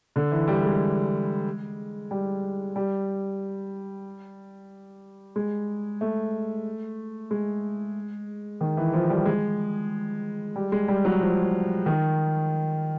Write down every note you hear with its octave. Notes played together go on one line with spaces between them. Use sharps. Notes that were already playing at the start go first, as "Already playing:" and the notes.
D3
E3
G3
G#3
G3
G3
G#3
A3
G#3
D#3
E3
F3
G3
G#3
G3
G#3
G3
F#3
F3
D#3